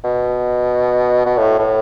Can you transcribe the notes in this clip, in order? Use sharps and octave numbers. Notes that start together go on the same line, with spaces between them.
B2
B2
A2
A2